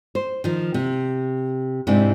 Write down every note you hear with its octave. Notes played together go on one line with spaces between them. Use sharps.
C5
D#3 F3
C3
G#2 C3 C4 D4 E4